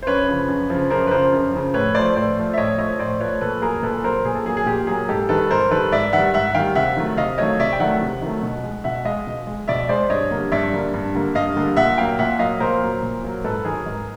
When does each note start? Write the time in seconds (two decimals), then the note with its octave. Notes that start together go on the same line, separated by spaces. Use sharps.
0.03 C5
0.07 F#2 B4 C#5
0.28 C#3 F3
0.48 F#2
0.70 C#3 F3
0.90 F#2 A#4 C5
1.07 B4
1.11 C#3 F3 A#4 C5
1.32 F#2
1.53 C#3 F3
1.74 A2 B4 C#5
1.95 F3 A3 C5 D5
2.16 A2 C5 D5
2.37 F3 A3
2.54 E5
2.58 A2 C#5 D#5
2.78 F3 A3 C#5 D#5
2.99 A2 C5 D5
3.20 F3 A3 B4 C#5
3.41 A#2 A4 B4
3.62 F#3 A#3 G#4 A#4
3.83 A#2 A4 B4
4.04 F#3 A#3 A#4 C5
4.25 A#2 G#4
4.35 A4
4.46 F#3 A#3 G#4
4.57 G#4
4.66 A#2 G4
4.87 F#3 A#3 G#4
5.09 G#2 G4 A4
5.29 D#3 G3 A4 B4
5.50 G#2 A#4 C5
5.71 D#3 G3 A4 B4
5.92 G#2 D5 E5
6.13 D#3 G3 E5 F#5
6.34 G#2 E5 F#5
6.54 D#3 G3 F5 G5
6.75 C3 E5 F#5
6.97 D#3 F#3 A3
7.17 C3 D#5 F5
7.38 D#3 F#3 A3 C#5 D#5
7.59 C3 D5 E5
7.73 G5
7.80 D#3 F#3 A3 E5 F#5
8.01 C3
8.22 D#3 F#3 A3
8.43 B2
8.63 G#3
8.84 B2 E5 F#5
9.05 G#3 D#5 F5
9.27 B2
9.47 G#3
9.68 B2 D5 E5
9.89 G#3 C5 D5
10.09 G2 C#5 D#5
10.31 D3 G3 A#3
10.52 G2 D5 E5
10.73 D3 G3 A#3
10.94 G2
11.14 D3 G3 A#3
11.35 G2 D#5 F5
11.56 D3 G3 A#3
11.77 A#2 E5 F#5
11.98 F#3 A#3 F5 G5
12.19 A#2 E5 F#5
12.39 F#3 A#3 D#5 F5
12.60 A#2 A#4 C5
12.81 F#3 A#3
13.03 A#2
13.24 F#3 A#3
13.44 G#2 A4 B4
13.65 D#3 F#3 G#4 A#4
13.86 G#2